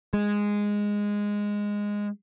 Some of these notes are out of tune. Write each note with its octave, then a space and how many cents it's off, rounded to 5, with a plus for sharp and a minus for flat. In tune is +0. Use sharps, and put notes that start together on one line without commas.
G#3 -10